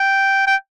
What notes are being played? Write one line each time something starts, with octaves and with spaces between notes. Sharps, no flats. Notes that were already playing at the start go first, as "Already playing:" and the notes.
Already playing: G5
G5